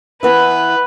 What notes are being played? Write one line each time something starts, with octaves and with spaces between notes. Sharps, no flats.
E3 B3 E4 B4